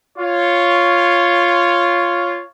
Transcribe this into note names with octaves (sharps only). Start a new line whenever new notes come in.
F4 C#5